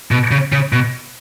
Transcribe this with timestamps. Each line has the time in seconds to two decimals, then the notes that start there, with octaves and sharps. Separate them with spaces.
0.11 B2
0.31 C#3
0.52 C#3
0.73 B2